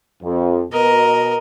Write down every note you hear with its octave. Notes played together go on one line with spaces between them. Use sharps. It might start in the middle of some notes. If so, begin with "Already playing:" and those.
F2
B2 A#4 D#5